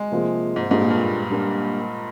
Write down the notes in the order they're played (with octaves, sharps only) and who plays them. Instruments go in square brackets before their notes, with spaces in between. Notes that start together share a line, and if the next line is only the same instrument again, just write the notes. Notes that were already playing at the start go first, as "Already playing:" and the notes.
Already playing: [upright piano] G#3
[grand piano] C3 F3 A#3 F4 G#4
[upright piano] G#2
[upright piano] G#2 [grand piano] G3 A#3 D4 F4 G#4
[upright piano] A#2
G2
[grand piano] G3 A#3 D4